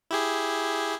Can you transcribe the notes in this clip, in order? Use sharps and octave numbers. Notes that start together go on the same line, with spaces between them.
E4 G4 G#4